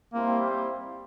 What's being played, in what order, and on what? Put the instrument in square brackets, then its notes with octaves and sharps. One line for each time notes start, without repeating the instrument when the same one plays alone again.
[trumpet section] G3 C4 E4 G4 C5 [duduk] A#3